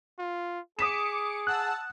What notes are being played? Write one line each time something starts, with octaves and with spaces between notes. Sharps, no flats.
F4
G#4 D6 D#6 B6 C#7 E7
F#5 A5 E6 F#6